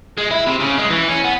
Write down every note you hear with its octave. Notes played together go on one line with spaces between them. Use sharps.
G#3
E4
C3
C#3
G#3
E3
C#4
B3